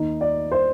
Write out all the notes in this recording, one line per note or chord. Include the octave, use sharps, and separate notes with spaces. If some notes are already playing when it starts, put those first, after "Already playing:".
Already playing: D#2 D#3 D#4
D5
C5